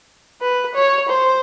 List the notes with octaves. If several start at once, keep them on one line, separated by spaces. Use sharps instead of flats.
B4
C#5
C5